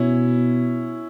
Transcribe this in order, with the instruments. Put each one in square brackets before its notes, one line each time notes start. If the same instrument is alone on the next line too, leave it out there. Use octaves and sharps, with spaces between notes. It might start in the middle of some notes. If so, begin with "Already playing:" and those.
Already playing: [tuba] B2 [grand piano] C#4 E4